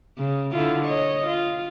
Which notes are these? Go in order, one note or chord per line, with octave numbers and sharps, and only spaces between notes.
C#3
D3 E4 F4
C#5 D#5
F4